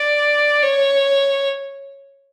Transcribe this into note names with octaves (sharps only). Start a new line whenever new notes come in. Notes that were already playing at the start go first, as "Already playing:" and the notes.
Already playing: D5
C#5